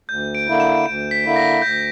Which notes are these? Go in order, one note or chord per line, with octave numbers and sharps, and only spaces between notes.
D2 G6
D7
D3 A#3 E4
E7
D2 D7
B6
D3 A#3 E4
A#6
D2 G6